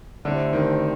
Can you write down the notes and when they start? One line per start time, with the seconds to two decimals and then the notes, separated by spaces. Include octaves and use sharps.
0.25 A2 D3 A3 C4 G4
0.53 D#3